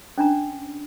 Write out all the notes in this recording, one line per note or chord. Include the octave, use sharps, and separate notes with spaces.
C#4 D4 A#5